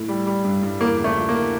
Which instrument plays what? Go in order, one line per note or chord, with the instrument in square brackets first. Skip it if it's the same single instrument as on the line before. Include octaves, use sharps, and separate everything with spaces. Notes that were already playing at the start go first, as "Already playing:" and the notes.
Already playing: [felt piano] A2
G3
G3
G2
G2
[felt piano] E2 [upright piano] A#3
[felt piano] C#3
[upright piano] A3
[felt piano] F3
[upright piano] A#3